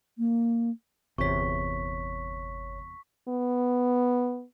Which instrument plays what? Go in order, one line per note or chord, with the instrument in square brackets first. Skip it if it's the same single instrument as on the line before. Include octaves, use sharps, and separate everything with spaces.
[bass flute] A#3
[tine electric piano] G1 C#5 [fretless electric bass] E2 C3 [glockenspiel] C#6 B6
[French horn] B3